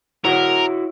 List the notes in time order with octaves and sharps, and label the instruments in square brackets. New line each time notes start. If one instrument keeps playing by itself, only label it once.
[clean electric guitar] E4 F#4 C#5 [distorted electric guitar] A#4